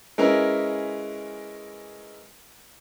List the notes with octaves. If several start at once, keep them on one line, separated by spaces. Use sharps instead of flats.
G#3 C#4 E4 A#4 B4